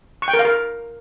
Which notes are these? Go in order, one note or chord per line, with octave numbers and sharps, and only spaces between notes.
C#6
G5
A#4
F5
A#4